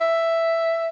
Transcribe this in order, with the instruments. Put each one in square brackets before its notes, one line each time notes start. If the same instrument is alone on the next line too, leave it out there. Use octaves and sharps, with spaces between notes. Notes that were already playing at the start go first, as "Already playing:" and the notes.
[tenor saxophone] E5